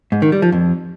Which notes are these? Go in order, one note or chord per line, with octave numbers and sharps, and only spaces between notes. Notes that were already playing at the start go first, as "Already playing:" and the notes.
G#2
D#3
G3
F3
F2